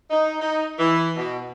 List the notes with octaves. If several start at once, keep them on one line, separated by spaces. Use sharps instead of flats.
D#4
D#4
E3
B2